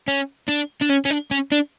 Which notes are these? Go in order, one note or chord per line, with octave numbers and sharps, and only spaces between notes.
C#4
D4
D4
C#4
C#4
D4
C#4
D4